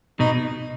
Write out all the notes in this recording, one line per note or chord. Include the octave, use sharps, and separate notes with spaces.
B2 D#4